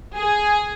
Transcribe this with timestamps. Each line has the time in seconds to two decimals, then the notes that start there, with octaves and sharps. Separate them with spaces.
0.16 G#4